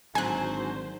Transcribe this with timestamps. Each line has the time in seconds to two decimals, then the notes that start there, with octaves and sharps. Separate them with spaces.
0.15 G#1 D3 F#3 C5 G#5 F#6